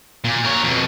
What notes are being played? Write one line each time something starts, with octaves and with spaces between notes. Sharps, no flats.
A#2
A#4 C#5
F2 B2